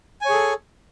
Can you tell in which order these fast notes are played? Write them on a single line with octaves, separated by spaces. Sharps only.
G#5 C#5 G#4 A4